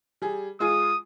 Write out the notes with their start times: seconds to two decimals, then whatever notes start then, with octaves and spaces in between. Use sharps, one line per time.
0.22 G3 G#4
0.60 G#3 F4 G#4 D#6